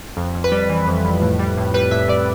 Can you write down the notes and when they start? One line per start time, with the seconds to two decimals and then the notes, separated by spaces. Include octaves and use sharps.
0.17 F2
0.35 F2
0.44 B4
0.52 G3
0.69 E3
0.87 F2
1.05 F2
1.21 A2
1.39 G3
1.57 A2
1.74 G3 B4
1.91 A2 E5
2.08 G3 D5